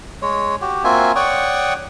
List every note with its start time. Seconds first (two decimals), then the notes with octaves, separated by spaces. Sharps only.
0.22 G#3 C#5
0.61 F#4 G4
0.84 A#3 C4 F4 F#4 E5 G#5
1.16 C#5 D5 F#5 G5 C#6 D#6